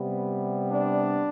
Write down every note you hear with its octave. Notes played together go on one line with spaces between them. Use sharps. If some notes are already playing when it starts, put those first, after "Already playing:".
Already playing: C3 G3 B3
D4